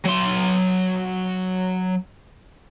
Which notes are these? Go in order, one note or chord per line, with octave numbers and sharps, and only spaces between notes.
F#3 C6